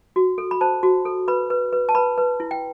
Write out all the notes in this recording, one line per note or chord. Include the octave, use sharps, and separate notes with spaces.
F#4
A4
B5
C5 A5
F#4
A4
B4 B5
B4
B4
A5
B4 B5
B4
E4
G5